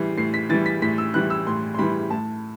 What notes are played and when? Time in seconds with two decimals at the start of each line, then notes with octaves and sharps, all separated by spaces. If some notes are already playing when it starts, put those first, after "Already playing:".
Already playing: A2 E3 G3 C7
0.17 A2 C7
0.34 B6
0.49 E3 G3 A6
0.66 B6
0.82 A2 B6
0.98 E6
1.14 E3 G3 F#6
1.30 E6
1.47 A2 C6
1.74 C6
1.79 E3 G3 B5
2.10 A2 A5